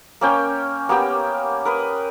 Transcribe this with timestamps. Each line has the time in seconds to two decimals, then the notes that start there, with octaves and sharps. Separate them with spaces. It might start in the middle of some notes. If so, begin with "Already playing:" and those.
0.21 A#3 C#4 G5
0.89 A#3 B3 G4 G5
1.65 A#4 B4 D#6